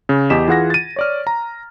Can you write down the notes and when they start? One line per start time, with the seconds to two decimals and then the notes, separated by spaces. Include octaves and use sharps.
0.09 C#3
0.30 E2 G4 D#5 B6 E7
0.48 E3 F4 G#4 F#5 G#6 A#6
0.70 A6 D#7
0.96 C#5 D5 F6
1.27 A#5